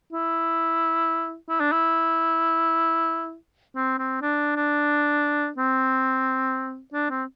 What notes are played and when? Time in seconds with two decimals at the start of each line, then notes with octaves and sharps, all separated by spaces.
0.13 E4
1.49 E4
1.60 D4
1.72 E4
3.76 C4
3.99 C4
4.22 D4
4.56 D4
5.58 C4
6.93 D4
7.10 C4